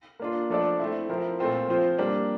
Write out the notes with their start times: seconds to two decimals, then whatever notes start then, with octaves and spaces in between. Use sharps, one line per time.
0.20 A#3 D4 F4
0.50 F3 A3 D4 A4 D5
0.80 A3 C4 E4
1.09 F3 C4 E4 A#4
1.39 A#2 A3 C4 F4
1.68 F3 C4 F4 C5
1.99 G3 A#3 D4